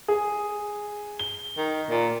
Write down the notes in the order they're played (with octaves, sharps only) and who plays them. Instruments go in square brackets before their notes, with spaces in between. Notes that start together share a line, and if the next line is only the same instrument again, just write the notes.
[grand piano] G#4
G7
[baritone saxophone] D#3
A#2